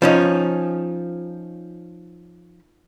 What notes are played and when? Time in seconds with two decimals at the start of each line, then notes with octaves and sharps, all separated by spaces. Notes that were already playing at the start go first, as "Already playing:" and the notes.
0.02 F3 C#4 D#4